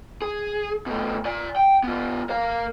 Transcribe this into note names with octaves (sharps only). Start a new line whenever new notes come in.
G#4
B2 A3
D5 G#5
G5
B3 F4
A#4 F5